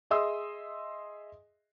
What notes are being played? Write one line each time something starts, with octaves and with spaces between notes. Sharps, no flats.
G#4 D#5 E5 C6 D#6 E6